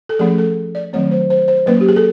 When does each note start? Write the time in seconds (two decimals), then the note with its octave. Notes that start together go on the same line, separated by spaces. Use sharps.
0.09 A4
0.19 F3 A3 C#4 G#4
0.38 A4
0.75 D5
0.93 D#3 F#3 A3 C4 C#5
1.11 C5
1.30 C5
1.48 C5
1.66 F#3 A#3 C#4 B4
1.81 G4
1.89 G#4
1.96 A4